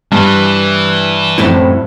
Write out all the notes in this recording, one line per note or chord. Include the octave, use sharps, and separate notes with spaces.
G2 E3
F#2 A2 C4 E4